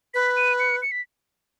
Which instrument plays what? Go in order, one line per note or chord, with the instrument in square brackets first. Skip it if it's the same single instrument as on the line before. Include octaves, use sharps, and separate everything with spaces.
[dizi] B4 [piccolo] B6
[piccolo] D#7
C#7
C#7
B6